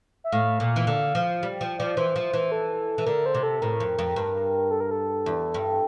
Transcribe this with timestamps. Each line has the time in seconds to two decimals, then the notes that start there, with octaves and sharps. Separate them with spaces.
0.24 E5
0.32 A2 F5
0.60 A#2
0.76 E3
0.87 D3
1.15 F3
1.43 G3
1.61 F3
1.78 F3 D5
1.97 E3 C5
2.16 F3
2.33 E3
2.52 A4
2.98 E3
3.06 D3 A#4
3.26 C5
3.34 C3
3.43 A4
3.62 A2 A#4
3.80 F2
3.99 F2
4.16 G2
4.71 A4
4.80 A#4
4.91 A4
5.26 E2
5.54 G2